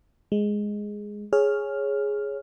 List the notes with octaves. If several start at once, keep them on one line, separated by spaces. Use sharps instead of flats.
G#3
G#4 C#5 F6